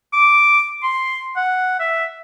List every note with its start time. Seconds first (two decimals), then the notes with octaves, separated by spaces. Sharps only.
0.13 D6
0.83 C6
1.36 F#5
1.80 E5